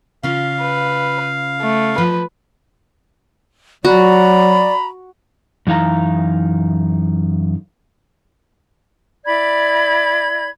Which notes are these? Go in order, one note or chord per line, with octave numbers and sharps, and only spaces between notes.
C#3 C#4 F4 F5
B4
A3
F3 B4
F#3 F#4 D5 A#5 B5
F#2 E3 D#4 F5 A#5
E4 D5 B5 G#6